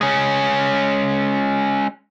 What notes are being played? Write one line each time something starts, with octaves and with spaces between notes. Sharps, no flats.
G#3 C#4